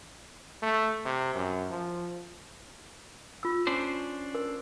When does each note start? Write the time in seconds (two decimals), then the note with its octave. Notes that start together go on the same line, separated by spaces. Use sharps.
0.63 A3
1.05 C3
1.35 F#2
1.70 F3
3.43 F4 E6
3.67 C#4 D4 C5
4.34 A#4